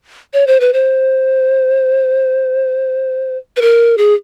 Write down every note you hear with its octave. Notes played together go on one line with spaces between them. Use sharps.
C#5
C5
B4
C5
B4
A#4
G#4